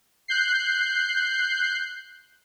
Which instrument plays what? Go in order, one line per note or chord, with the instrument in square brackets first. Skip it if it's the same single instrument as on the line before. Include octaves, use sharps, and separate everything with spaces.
[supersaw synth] F#6 G6 C7